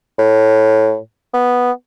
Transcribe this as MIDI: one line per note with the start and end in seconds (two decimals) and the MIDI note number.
0.19 0.98 45
1.34 1.71 59